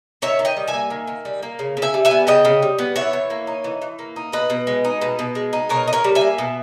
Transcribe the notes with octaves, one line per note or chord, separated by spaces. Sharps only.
D#3 C#5 E5
D#3
D#5 G5
G3
E5 G#5
A#3
D#3
D#3
G3
A#3
C#3
C#3
E5 G#5
G3
E5 G#5
B3
C#3 D#5 G5
C#3
G3
B3
E3 C#5 E5
E3
A#3
D#4
E3
E3
A#3
D#4
B2 B4 D#5
B2
G#3
D#4
B2
B2
G#3
D#4
B2 A#4 C#5
D#4
A#4 C#5
G3
E5 G#5
A#3
B2